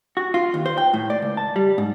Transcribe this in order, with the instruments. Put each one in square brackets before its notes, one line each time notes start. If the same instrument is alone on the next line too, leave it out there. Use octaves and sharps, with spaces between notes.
[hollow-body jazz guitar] F#4
F4
D#2
C5
G5
A2
D5
C#2
A5
G3
G#2